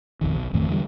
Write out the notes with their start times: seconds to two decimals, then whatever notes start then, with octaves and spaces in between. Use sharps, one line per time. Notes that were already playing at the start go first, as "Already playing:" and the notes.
0.21 B1 F2 D#3
0.35 B1
0.53 A1 F2 D#3 A3
0.68 E2 D3 D#3 G3